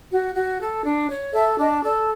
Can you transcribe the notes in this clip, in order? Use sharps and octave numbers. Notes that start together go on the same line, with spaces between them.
F#4
F#4
A4
D4
C#5
A4 E5
D4 D#5
A4 D5